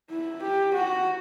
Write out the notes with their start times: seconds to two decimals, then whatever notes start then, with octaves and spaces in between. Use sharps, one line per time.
0.10 E4
0.42 G4
0.74 F#4